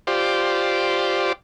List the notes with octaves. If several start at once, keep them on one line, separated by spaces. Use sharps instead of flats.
F4 G4 C5 D5